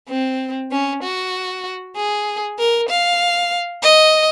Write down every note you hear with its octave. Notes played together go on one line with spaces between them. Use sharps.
C4
C#4
F#4
G#4
A#4
F5
D#5